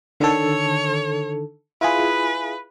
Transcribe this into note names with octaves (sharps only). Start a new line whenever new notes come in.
D3 D#3 A4 C#5
E4 F4 G#4 B4